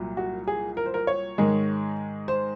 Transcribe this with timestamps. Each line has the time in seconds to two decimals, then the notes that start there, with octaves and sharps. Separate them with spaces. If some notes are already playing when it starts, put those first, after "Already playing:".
Already playing: C2 A#2 F#3
0.17 F#4
0.47 G#4
0.77 A#4
0.86 C5
0.94 A#4
1.07 C#5
1.38 G#2 D#3 G#3
2.28 C5